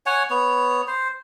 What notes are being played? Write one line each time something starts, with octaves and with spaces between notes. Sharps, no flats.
C#5 F#5 G#5
B3 C#5
C5